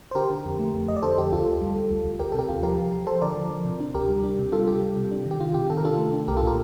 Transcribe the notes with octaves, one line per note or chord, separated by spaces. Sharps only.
C5
D3 G4 A#4
D3
F2
A3
F2
F2 D#5
D5
D3 A4 C5
F2 G4
D2 F4 A4
D2
G3
G3
D2
D2
D2 G4 A#4
A4
C3 G4 A#4
D#2 F4
F3 G4 A#4
F3
F3
F3 A4 C5
D3 A#4 D5
F3
F3
C3
D4
D2 G4 A#4
G3
D4
C3
G3 F4 A4
G3 G4
G3
C3
D4
D#3
G4
D#3 F4
C3 G4
D#3 A4
A#4
D4 F4 A4
A3
D4
C2 G4 A#4
F4 A4
A#2 G4 A#4